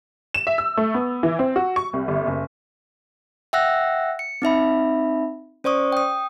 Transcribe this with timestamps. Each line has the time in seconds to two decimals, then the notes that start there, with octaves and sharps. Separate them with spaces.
0.34 E7
0.47 E5
0.58 E6
0.77 A3
0.94 B3
1.23 E3
1.39 C4
1.56 F#4
1.76 C#6
1.93 C2
2.08 G1
2.27 F#1
3.53 E5 F#5 G5 E6 F#6 A#6
4.19 C#7
4.42 C4 D#4 E5 B5
5.64 C#4 C5 D5 C#6 D#6
5.92 G5 D#6